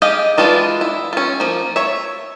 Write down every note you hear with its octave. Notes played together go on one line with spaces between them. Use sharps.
G4 G#4 D#5 F5
E3 G#3 D4 F4 F#4
E4
C#4 F4
F3 A#3
C#5 E5